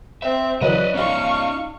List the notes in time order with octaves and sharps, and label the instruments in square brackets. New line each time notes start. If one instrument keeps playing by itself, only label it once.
[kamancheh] C4 [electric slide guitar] E5
[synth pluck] C#3 E3 F#3 [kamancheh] B4 [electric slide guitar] D5 D#5
[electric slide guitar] C#4 D#4 D#5 [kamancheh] F5 C#6